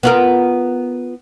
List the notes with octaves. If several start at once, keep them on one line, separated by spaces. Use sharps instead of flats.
B3 F4 A#4